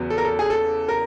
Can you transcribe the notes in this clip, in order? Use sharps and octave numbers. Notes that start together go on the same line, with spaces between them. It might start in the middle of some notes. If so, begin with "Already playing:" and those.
Already playing: E2 C#3 F#3 B3
A4
A#4
A4
G#4
A4
A#4